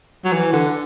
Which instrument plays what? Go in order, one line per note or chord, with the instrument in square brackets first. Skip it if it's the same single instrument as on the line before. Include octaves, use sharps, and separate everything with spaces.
[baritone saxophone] F#3
E3
D3